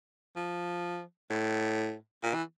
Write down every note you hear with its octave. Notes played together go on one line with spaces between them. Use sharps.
F3
A2
A#2
E3